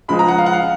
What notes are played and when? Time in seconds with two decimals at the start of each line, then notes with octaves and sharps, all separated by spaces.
0.08 C#2 C#3 F3 G#3 B5
0.19 A#5
0.28 F#5
0.38 F5
0.46 F#5
0.53 F5